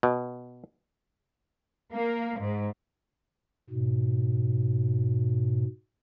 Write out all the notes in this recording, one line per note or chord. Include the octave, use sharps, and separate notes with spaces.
B2
A#3
G#2
G#2 B2